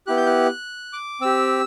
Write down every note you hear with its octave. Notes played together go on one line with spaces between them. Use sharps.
B3 E4 G4 F#6
G6
F#6
D6
C4 G4 E6